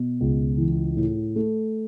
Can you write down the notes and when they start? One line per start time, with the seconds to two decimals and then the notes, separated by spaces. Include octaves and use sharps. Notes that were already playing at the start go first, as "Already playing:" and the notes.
Already playing: B2
0.20 C#2
0.58 E3
0.97 A2
1.36 A3